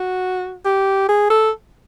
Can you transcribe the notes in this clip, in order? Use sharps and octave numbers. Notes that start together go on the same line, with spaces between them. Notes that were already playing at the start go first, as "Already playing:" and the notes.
Already playing: F#4
G4
G#4
A4